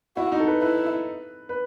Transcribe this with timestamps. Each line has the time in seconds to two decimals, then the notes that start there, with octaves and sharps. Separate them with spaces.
0.16 E4 F#4
0.32 D#4
0.40 A4
0.47 B4
0.62 E4 B4
1.49 B4